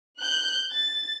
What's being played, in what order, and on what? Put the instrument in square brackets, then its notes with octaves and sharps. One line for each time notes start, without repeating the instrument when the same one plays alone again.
[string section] F#6 G6
A6